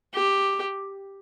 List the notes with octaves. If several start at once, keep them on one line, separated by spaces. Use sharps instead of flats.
G4